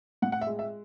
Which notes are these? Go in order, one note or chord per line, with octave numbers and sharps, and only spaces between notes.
A2 F#5
F#5
E5
G#3
E5